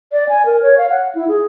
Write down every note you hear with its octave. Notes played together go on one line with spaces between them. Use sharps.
D5
G#5
A#4
C#5
F5
F#5
E4
G#4